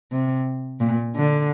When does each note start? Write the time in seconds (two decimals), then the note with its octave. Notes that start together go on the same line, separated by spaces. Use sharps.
0.12 C3
0.80 A#2
1.16 D3